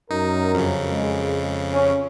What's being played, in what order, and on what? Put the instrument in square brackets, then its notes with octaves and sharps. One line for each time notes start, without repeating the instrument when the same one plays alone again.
[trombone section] F#2 A#4 [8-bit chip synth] D#4
[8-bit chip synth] F2 C#3
[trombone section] G#3
C#4